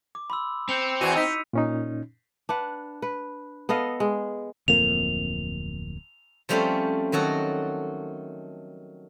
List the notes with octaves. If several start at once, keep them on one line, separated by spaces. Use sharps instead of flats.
D6
B5 C6 E6
C4 G6 C#7 F7
E2 E3 F#4 C#7 D#7
D#4 E6 B6
A#2 C#4 D#4
D4 B4 F#5
B4
B3 A4 D#5 F5
G#3
D1 F2 A#3 F7
F3 G3 A3 C4 C#4 A4
D#3 F#3 F#4 A4